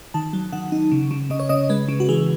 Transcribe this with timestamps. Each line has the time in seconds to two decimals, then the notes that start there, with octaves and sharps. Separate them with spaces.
0.14 D#3 A5
0.33 F#3
0.52 D#3 F#5
0.72 D#4
0.92 C#3
1.11 C#3
1.30 C#3 D#5
1.40 C#5
1.49 C#3 D#5
1.69 G#3 B4
1.88 C#3
2.00 F#4
2.09 E3 G#4